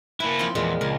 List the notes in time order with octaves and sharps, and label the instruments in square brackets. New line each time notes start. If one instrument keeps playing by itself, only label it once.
[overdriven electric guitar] A#3 E4 [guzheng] B4
[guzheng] F3 C4
[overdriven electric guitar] E2 [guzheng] A#2 F3 G#3
[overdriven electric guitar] C#2 [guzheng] A#4